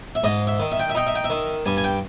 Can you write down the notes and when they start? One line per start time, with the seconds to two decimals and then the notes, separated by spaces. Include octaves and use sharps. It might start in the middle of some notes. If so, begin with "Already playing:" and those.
0.15 E5
0.24 G#2 D#5
0.47 E5
0.59 D#3
0.72 E5
0.80 G5
0.90 E5
0.95 D#4 G5
1.07 E5
1.16 G5
1.24 E5
1.30 D#3
1.66 G2 G#5
1.77 G#5
1.84 G5